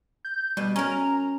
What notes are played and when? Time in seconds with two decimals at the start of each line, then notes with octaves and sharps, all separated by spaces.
0.25 G6
0.57 B2 G3
0.76 C#4 A#4 A#5